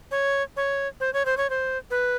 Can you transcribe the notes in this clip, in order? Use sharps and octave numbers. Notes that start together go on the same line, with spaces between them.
C#5
C#5
C5
C#5
C5
C#5
C5
B4